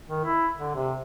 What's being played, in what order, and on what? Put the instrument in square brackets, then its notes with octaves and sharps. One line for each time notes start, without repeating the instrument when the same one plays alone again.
[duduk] D#3
E4
D3
C3